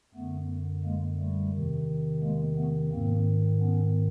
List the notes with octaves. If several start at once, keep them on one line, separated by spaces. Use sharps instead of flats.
F#2 D3 A3 B3
G#3 A#3
G3 A3
E2 C3 D#3
G#3 A#3
A3 B3
G#2 D#3 A#3 C4
B3 C#4